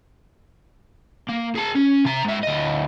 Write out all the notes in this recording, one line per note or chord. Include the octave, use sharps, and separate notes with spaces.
A#3
G#4 A5
C#4
C3 A#5
G#2 E5
D2 D#5